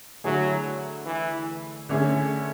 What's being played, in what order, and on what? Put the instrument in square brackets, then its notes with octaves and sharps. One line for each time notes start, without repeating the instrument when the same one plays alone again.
[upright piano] D3 A3 E4 G#4 [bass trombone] F#3
[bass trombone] E3
[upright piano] D3 A3 C#4 G#4 [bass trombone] E3